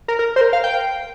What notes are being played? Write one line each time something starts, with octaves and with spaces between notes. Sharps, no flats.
A#4
A#4
C5
A#4
F5
G5